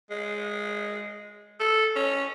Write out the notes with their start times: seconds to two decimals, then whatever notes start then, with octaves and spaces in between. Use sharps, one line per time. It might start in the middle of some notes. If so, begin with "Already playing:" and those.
0.11 G#3
1.60 A4
1.96 C#4